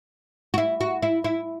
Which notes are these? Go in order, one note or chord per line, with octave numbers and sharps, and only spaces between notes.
F#4
E4
F#4
E4
E4